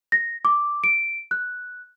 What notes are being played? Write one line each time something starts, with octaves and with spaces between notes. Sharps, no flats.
A#6
D6
D7
F#6